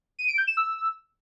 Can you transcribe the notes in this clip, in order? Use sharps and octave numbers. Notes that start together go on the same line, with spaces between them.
D#7
D7
G6
E7
E6